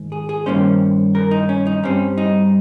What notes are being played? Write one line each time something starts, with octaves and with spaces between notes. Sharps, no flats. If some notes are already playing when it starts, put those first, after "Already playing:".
Already playing: G#2 D#3
G#4
G#4
G2 D#3 A#3 C#4 C5
A#4
D#4
C#4
D#4
G2 G3 C4 C#4
D#4